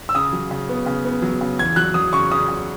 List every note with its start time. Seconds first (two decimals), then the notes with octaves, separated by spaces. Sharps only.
0.09 E6
0.15 C#3 D#6
0.33 F#3
0.51 C#3
0.69 B3
0.86 C#3
1.05 B3
1.22 F#3
1.41 C#3
1.59 E2 G#6
1.76 F#3 F#6
1.94 F#3 D#6
2.13 C#3 C#6
2.31 C#3 D#6
2.48 C#3